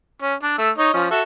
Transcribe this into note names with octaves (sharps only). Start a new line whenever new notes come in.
C#4
D4
A3 E6
D#4 C#5 D#5
F3 C#4
F#4 A4 E5